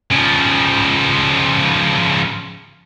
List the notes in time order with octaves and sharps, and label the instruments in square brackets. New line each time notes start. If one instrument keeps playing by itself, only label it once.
[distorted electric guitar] C#3 F3